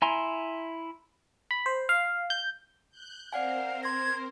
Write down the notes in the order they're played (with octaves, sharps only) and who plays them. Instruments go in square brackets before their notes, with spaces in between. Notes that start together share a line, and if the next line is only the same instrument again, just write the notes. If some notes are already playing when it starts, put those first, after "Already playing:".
[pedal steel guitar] E4 G#5 A#5 C6
[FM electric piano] B5
C5
F5
G6
[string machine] F#6 G6
[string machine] C4 A#4 C5 [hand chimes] D5 F#5 G#5 [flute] F5
[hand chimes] C6 A#6 [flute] G#6